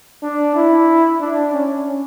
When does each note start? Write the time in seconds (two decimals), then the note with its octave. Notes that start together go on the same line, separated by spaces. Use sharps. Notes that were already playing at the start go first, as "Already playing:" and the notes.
0.23 D4
0.56 E4
1.21 D4
1.54 C#4